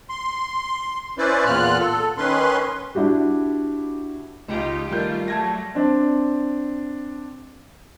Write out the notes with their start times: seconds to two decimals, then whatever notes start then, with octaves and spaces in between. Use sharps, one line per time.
0.10 C6
1.18 C#4 E4 B4 C5 D5
1.45 E2 A#2 F4 F6 F#6
1.80 A4
2.18 D#3 C#4 B4 C6
2.95 D4 E4 F#4 G4
4.48 C#2 D#4 F4 G4
4.89 D#3 G3 A3 F4 A#4 G6
5.28 F#3 G3 A3 A5 G#6 A#6
5.75 C4 D4